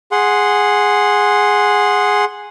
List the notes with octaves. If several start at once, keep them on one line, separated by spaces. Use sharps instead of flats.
G#4 F#5 C6